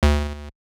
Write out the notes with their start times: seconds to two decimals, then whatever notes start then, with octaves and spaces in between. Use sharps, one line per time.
0.03 D2